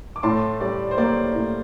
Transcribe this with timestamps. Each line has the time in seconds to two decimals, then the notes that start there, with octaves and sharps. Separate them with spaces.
0.16 D6
0.23 A2 A5 C6
0.60 G3 D5
0.91 C5
0.97 A#3 D5
1.34 A2